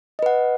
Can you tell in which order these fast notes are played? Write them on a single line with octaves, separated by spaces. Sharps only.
D#5 B4 F#5